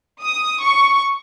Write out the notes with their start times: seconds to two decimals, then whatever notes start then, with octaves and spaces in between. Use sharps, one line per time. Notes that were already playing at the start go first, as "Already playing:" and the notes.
0.22 D#6
0.63 C#6